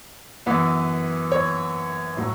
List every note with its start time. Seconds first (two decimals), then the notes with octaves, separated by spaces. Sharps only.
0.46 F#2 E3 B3
1.32 C#5
2.17 A2 F#3